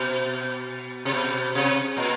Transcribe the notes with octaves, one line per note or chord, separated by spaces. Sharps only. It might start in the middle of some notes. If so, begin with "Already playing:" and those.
Already playing: B2
C3
B2
C3
A#2